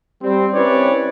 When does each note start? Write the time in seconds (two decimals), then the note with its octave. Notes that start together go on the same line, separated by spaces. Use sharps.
0.22 G3 C4
0.53 C4 C#4 E4 B4 C#5 D5